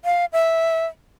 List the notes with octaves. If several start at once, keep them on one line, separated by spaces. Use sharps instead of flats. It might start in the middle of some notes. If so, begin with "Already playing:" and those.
F5
E5